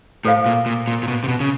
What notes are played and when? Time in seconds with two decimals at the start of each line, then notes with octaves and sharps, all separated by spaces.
0.25 A2 A4 C5 F5
0.46 A#2
0.66 A#2
0.88 A#2
1.03 A#2
1.08 B2
1.24 C3
1.28 B2
1.40 C#3